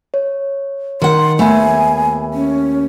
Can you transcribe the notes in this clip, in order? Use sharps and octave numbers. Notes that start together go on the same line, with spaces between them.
C#5
D#3 F#5 C6
D#2 A3 B3 E5 G#5 B5
C#4